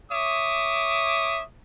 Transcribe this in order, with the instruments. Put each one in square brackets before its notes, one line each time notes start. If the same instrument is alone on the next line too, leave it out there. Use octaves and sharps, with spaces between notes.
[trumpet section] C#5 E5 D6 D#6